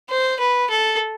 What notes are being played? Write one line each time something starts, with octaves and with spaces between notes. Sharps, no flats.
C5
B4
A4